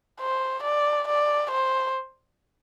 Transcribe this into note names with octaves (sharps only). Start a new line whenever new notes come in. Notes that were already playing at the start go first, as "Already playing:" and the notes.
C5
D5
D5
C5